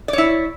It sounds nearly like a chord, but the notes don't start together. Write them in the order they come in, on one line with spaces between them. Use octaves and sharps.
D5 C#5 E4